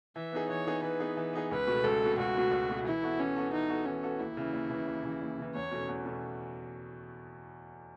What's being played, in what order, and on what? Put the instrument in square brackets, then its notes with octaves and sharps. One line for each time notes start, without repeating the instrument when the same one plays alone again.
[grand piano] E3 [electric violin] E5
[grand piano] B3 D#4 G#4
[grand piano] E3 [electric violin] C#5
[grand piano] B3 D#4 G#4
[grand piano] E3 [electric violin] B4
[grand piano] B3 D#4 G#4
E3
B3 D#4 G#4
[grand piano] C#2 [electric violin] B4
[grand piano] B2 A3
[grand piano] C#2 [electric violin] A4
[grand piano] B2 A3
[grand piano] C#2 [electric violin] F#4
[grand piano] B2 A3
C#2
B2 A3
[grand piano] E3 [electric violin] E4
[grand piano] B3 F#4 A4
[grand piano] E3 [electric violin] C#4
[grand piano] B3 F#4 A4
[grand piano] E3 [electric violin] D#4
[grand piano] B3 F#4 A4
[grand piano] E3 [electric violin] C#4
[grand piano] B3 F#4 A4
[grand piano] D#2 [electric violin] E4
[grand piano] C#3 E3
D#2
C#3 E3
D#2
C#3 E3
D#2
C#3 E3
[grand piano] E2 [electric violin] C#5
[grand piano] B2 A3 C#4
E2
B2 A3 C#4